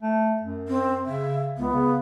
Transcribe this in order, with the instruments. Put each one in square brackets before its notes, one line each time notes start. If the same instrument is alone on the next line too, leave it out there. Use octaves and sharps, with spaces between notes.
[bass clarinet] A3
F#2
[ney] C4
[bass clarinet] C#3 [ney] E5
[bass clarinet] C#2 [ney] B3
[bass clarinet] C#3